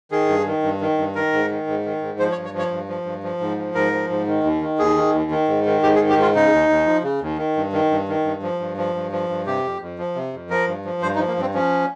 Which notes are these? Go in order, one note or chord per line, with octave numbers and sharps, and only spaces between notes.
D#3 G#4
G2
D#3
G2
D#3
G2
D#3 A#4
G#2
D#3
G#2
D#3
G#2
F3 C5
C#5
G2
C#5
F3
C#5
G2
F3
G2
F3
G#2
F3
G#2 A#4
F3
G#2
D#3
D#2
D#3
D#2 G#4
D#3
D#2
D#3
G#2
D#3
G#2 G4
G#4
D#3
G4
G#2 F4
C#3 D#4
D#2
D#2
F3
C#3
D#2
D#3
G2
D#3
G2
D#3
G2
F3
G2
F3
G2
F3
G2
C3 G4
F2
F2
F3
C3
F2
F3 A#4
G2
F3
G2 C5
D#4
F3
A#3
G2 C4
F3 C#4